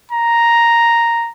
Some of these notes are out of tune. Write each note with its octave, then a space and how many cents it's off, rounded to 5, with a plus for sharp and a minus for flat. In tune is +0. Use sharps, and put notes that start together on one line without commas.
A#5 +0